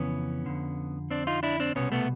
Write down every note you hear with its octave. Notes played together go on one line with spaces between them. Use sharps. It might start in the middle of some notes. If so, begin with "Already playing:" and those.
Already playing: F2 C#3 E3 B3 C#4
F2 D3
C4 D4
D#4 F4
D4 E4
C4 D4
C2 B2 B3 C#4
A3 B3